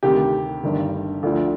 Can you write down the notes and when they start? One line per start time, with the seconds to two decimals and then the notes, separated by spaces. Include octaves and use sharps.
0.03 D2 C3 D#3 G4
0.63 G1 G2 D#3
1.23 D2 D3 F3